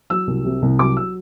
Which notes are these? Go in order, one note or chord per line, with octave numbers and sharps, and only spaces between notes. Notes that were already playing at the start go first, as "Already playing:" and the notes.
F#3 E6
C2
C3
C2
F#3 D6
E6